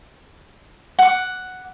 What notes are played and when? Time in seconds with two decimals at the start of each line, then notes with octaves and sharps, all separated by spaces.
0.99 F#5 D6